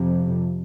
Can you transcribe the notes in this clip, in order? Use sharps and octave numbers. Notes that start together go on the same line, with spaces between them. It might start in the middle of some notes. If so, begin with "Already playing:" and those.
Already playing: F2 C3